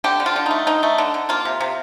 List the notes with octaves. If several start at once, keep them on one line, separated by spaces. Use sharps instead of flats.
D3 G4
D3
F4
D3
A3 D#4
D3 D#4
A3
D3
D3
A#3 F4
C3
C3